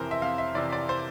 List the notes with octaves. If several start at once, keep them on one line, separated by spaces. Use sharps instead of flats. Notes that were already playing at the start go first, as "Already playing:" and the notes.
Already playing: F2 C3 E3 A#4 C5
E5
F2 F5
E5
C3 E3 D5
D5
C5